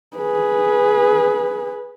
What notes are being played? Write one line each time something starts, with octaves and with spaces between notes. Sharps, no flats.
G#4 B4